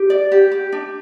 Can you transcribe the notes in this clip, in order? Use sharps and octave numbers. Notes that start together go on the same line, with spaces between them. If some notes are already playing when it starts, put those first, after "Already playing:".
Already playing: G4
D5
G4
G4
D4